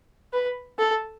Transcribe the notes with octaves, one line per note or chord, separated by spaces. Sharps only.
B4
A4